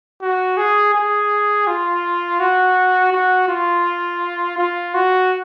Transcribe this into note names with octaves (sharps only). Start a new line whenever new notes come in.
F#4
G#4
G#4
F4
F#4
F#4
F4
F4
F#4